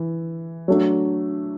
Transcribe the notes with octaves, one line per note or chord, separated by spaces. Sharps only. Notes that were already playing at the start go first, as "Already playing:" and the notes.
Already playing: E3
F#3 A3 D4